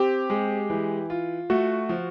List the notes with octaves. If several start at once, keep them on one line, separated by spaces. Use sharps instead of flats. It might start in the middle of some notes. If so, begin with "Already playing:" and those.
Already playing: C4 G4
G#3
E3
F4
A3 F#4
F3